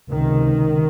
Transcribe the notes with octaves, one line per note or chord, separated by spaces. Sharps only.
C#2 C3 D#3